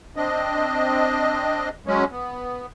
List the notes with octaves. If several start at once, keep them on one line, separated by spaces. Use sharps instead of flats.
C4 D4 D#5
F#3 G#3 C#4
B3